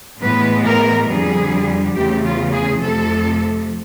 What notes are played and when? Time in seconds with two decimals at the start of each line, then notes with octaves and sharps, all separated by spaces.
0.21 A2 E3 G#3 B3 B4
0.64 A#4
1.07 F2 D3 G3 G#4
1.94 E2 C#3 E3 A3 G4
2.23 F4
2.52 G#4
2.80 F2 C3 F3 A3 A4